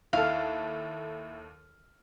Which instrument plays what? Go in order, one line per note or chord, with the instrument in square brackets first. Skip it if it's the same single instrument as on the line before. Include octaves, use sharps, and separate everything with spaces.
[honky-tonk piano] D#2 A4 [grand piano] E4 F6 [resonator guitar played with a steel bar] F5